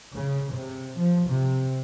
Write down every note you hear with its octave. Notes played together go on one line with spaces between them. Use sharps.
C#3
C3
F3
C3